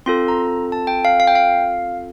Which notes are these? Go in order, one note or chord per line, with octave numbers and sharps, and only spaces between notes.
C4 F4 A4 C6
A#5
A5
G5
F5
F5
G5
F5